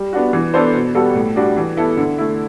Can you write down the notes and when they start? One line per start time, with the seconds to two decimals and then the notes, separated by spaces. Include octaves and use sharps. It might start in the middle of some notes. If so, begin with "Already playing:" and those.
Already playing: G3
0.13 B3 D4 F#4
0.33 E3
0.54 B3 D4 A4 C5
0.74 B2
0.95 G3 B3 F#4 A4
1.15 A2
1.36 G3 D4 F#4
1.56 E3
1.77 B3 E4 A4
1.97 D3
2.18 A3 E4